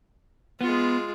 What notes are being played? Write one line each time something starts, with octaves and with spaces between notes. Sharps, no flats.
G#3 B3 F4